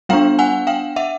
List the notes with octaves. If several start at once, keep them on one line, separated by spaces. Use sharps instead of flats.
G3 B3 D4 F5 G5
F#5 G#5
F5 G5
E5 F#5